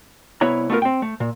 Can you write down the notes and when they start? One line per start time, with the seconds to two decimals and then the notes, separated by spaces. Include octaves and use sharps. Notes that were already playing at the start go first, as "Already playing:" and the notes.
0.41 C2 B3 E4 B4 C#5 A#5
0.70 A3 B3 F4 A#4
0.82 C4 G5
1.02 A3
1.20 A#2